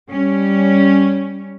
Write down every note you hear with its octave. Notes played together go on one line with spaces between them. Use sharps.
G3 C#4